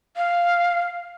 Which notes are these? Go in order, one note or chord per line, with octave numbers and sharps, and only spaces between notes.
F5